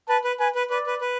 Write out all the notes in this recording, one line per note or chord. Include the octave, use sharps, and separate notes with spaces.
B4 A5
B4
B4 G#5
B4
B4 D5
B4
B4